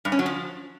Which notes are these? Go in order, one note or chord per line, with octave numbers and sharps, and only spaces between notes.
G2
C#4
F#3
F3